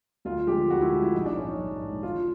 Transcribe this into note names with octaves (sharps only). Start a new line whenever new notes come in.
D2 F4
D3 F3 G#3 G4
D2 F#4
E4
D3 F3 G#3
E4
A#1 D#4
D4
G#2 E3 C#4
D#4
A#1
G#2 E3
E1 F4